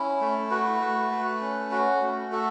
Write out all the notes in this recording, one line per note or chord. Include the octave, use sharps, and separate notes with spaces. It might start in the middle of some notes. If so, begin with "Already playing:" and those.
Already playing: C#4 E4
A3
F#4 B4
A3
A3
C#4
F#4
A3
F#4 A4